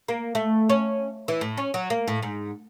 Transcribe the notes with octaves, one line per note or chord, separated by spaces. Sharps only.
A#3
A3
C#4
E3
A2
C#4
F#3
A#3
A2
G#2